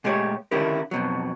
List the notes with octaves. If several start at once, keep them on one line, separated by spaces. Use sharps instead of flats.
A#2 G#3 A3 G4 C#5
D3 D#3 C#4 E4 G4 A#4
F2 B2 F#3